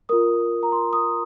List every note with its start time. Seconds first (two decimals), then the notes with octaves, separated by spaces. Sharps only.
0.09 F4 A#4 D#6
0.63 A#5
0.72 C6
0.93 D#6